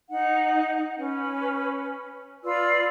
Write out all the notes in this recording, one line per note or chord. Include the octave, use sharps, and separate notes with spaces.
D#4 F#5
C#4 B4
F4 B4 D5 E6